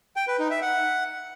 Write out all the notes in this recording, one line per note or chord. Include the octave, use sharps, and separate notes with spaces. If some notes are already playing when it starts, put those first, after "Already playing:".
G5
B4
D#4
E5
F#5